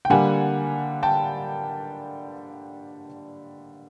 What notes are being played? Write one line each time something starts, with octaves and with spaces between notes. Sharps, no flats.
G5
D3 G3 A#3 F#5 G#5
G5 A5